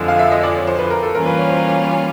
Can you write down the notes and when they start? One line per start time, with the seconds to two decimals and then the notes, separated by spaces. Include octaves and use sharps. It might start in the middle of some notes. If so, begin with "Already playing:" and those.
Already playing: F2 D3 F3 G#3
0.08 F5
0.19 E5
0.31 D#5
0.43 D5
0.56 C#5
0.67 C5
0.78 B4
0.90 A#4
1.03 A4
1.14 E3 G3 A#3 C#4 F4 A#4
1.26 B4
1.38 C#5
1.49 C5
1.68 C#5
1.85 C#5